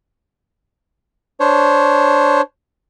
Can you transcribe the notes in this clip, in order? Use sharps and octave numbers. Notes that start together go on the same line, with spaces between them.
D4 C5 C#5